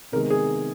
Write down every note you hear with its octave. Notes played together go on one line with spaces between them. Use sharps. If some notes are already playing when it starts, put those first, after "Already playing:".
C3 D#3 G#3 B3 A#4
G#4